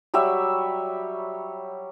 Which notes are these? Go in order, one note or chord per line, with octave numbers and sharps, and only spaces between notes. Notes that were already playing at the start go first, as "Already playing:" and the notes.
F#3 G3 C#5 E5